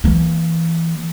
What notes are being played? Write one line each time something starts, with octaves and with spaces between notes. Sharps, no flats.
E3 A#3